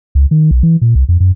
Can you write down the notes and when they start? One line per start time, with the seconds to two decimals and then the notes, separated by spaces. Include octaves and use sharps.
0.15 C#2
0.31 D#3
0.51 B1
0.63 E3
0.82 A#2
0.95 C2
1.09 F2
1.20 F#2